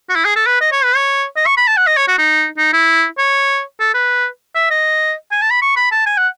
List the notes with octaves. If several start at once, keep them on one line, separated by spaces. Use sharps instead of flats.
F#4
E4
G#4
A4
B4
D#5
C#5
B4
C#5
D#5
C#6
B5
A5
F#5
D#5
C#5
F#4
D#4
D#4
E4
C#5
A4
B4
E5
D#5
G#5
A5
B5
C#6
B5
A5
G#5
F#5